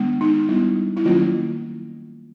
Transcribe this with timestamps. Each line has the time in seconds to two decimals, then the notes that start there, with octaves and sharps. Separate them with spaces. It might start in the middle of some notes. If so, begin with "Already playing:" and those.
Already playing: D#3 G#3 B3 D4
0.21 D#4
0.49 G3 B3 D4 E4
0.97 E4
1.05 D#3 F#3 A#3 C#4 F4